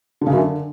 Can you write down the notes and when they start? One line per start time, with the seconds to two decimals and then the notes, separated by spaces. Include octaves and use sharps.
0.21 D3
0.27 C#3
0.32 F#2
0.37 D3